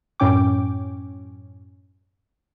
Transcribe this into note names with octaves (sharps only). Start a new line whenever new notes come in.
F#2 A2 C#4 G5 D6